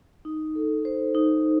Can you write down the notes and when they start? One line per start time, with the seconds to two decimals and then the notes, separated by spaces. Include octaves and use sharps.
0.25 D#4
0.55 A4
0.85 C5
1.15 D#4